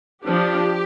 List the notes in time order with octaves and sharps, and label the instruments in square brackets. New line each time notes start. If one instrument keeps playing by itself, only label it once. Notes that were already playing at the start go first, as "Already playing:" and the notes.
[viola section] F3 D4 G4